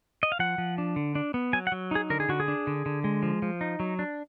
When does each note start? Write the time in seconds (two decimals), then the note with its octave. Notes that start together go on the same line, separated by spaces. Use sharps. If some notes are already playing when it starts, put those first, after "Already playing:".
0.23 D#5
0.32 F5
0.39 F3 F#5
0.58 F3
0.78 D4
0.96 D3
1.15 D4
1.34 B3
1.53 F#3 G#5
1.67 F#5
1.72 F#3
1.91 D#4 G#4
2.10 D3 A#4
2.20 G#4
2.29 D3 F#4
2.40 G#4
2.48 D4
2.67 D3
2.86 D3
3.04 G#3
3.23 F3
3.42 F3
3.61 D#4
3.80 F#3
3.99 D4